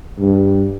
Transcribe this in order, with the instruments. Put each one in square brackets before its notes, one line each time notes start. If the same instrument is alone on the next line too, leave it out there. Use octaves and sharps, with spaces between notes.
[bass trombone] G2